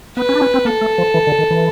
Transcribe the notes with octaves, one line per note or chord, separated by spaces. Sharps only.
B3 B4
C#4
D4
C#4
C4
A#3 A4
A3
F3
E3
D3
D#3
E3